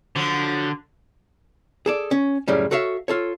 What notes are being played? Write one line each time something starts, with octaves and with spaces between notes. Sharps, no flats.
D3 F3 F#3
G#4 A4 D5
C#4
F#2 A2 C#3 G3 C#4
F#4 A4 C#5 E5 F5
F4 A4 C#5